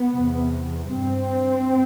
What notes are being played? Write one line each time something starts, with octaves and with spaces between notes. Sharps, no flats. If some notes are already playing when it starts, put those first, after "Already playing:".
Already playing: B3
E2 C3
G2 C4